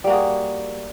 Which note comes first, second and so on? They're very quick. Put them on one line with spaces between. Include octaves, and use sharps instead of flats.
G3 A#3 F#4 G#4